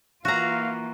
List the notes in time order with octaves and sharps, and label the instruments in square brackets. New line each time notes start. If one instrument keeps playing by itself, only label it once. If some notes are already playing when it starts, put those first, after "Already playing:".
[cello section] E3 A#3 F4 [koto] F#4 A#5 [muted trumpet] F5